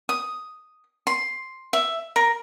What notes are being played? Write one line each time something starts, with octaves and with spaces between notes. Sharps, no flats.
D#6
C6
E5
A#4